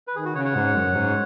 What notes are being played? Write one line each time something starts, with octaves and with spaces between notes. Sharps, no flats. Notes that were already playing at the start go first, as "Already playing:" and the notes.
B4
D#3 G#4
F#4
C#3 C#5 F#5
C#5 F#5
G#2
F#2
G#2